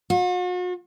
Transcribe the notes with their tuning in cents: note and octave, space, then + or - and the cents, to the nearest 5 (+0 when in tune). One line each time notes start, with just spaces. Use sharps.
F#4 -45